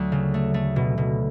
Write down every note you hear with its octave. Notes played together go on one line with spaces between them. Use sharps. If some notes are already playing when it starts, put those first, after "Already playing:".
Already playing: D2 F#3
C#3
A3
A3
B2
B2